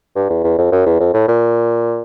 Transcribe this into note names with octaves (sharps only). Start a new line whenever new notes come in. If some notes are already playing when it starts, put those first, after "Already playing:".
G2
E2
E2
F2
F#2
E2
F2
A2
A#2